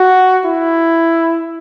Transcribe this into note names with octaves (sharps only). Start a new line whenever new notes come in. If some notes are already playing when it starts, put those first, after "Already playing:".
Already playing: F#4
E4